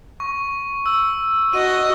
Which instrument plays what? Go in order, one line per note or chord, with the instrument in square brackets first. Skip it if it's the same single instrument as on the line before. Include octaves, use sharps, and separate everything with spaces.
[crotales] C#6
E6
[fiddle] F#4 D#5 [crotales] D#7